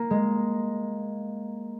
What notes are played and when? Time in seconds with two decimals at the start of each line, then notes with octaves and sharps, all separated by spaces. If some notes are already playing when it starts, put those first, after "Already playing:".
Already playing: A#3
0.10 G#3